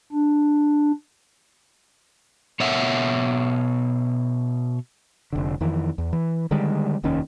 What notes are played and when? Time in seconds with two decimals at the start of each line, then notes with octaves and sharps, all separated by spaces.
0.12 D4
2.60 B2 C#5 E5 F#5
5.33 F1 D3
5.61 F2 D#3 E3
5.98 E2
6.13 E3
6.51 D3 D#3 G3 G#3
7.03 F1 D#2 D#3 C#4